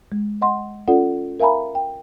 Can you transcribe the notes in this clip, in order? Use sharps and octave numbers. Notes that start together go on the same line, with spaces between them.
G#3
D#5 F#5 C6
C#4 F4 A4 D5 F#5
A#4 E5 F5 G#5 A#5 B5
G5